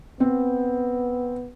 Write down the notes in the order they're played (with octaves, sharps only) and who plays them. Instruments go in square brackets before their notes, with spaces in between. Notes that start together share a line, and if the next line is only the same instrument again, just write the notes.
[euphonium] B3 [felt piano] C4